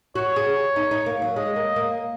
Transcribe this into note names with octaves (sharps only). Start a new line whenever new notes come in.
F#4 C#5
G#4
D#4
D#4
A#3
F#3
G#3 D#5
A#3
A#3